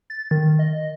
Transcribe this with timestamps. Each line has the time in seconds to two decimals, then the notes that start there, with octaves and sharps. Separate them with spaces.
0.10 A6
0.31 D#3
0.59 D#5